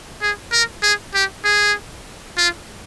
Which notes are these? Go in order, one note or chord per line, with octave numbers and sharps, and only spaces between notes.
G#4
A#4
G#4
G4
G#4
F4